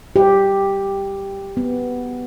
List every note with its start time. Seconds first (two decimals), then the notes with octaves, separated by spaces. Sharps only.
0.16 G4
1.57 B3